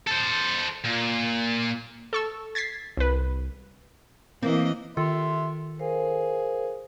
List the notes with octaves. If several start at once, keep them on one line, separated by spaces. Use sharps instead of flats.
A4 C5
A#2
A4 C#6 E6
G#6 A6 B6 C7
C2 B4
E3 A#3 C4 D#5
D#3 F4 A4 E5 C6
G#4 A#4 C5 F5